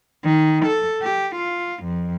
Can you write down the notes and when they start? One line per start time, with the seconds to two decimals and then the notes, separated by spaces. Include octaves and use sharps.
0.25 D#3
0.66 A4
1.02 G4
1.36 F4
1.84 F2